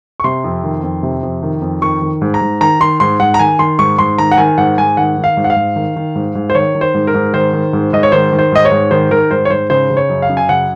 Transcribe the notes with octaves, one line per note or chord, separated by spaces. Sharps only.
C#6
C3 C6
F2
D#3
F2
C3
F2
D#3
F2
D#3 C#6
D#3
G#2
A#5
G#2
D#3 A#5
D#3 C6
G#2 C6
G#2 F#5
A#5
D#3 G#5
D#3 C6
G#2 C#6
G#2 C6
D#3 A#5
F#5
D#3 G#5
G#2 F#5
G#2 G#5
D#3 F#5
D#3
F5
G#2
F#5
F5
G#2
D#3
D#3
G#2
G#2
C5
D#3 C#5
D#3
C5
G#2
A#4
G#2
D#3 C5
D#3
G#2
G#2 D#5
C#5
D#3 C5
D#3
C5
G#2 D#5
C#5
G#2
D#3 C5
D#3 A#4
G#2 C5
C#5
G#2 C5
C#3 C5
C#3
C#5
F#2
F5
F#2
G#5
C#3 F#5